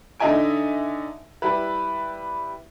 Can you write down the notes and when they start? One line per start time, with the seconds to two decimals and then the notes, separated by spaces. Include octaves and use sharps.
0.20 D3 D#4 D#5 E5 G#5 D7
1.42 G3 E4 B4